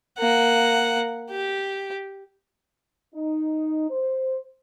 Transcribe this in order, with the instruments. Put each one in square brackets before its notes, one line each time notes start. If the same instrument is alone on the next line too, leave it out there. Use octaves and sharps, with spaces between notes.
[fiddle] A#3 F#5
G4
[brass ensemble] D#4
C5